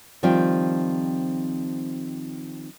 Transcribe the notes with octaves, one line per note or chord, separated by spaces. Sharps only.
D#3 F3 G3 C4 C5 G5